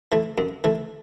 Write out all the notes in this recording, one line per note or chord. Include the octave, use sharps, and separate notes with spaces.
E3 A3
F#2
E3 A3